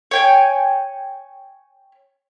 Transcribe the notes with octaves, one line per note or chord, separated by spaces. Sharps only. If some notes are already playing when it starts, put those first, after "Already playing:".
C#5 G5 G#5